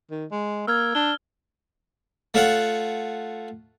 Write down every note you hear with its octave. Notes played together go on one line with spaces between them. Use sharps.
D#3
G#3
A#3 E6 F6 G#6
D4 G7
A3 F4 C#5 F#5